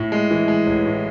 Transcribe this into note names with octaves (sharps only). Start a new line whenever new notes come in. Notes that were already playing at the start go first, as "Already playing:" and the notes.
Already playing: A2
G#3
E3
G#3
A1
A2